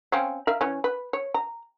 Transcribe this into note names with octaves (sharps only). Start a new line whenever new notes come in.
C4 C#4 F5
A#4 E5 F5
E3 C#4
B4
C#5
A#5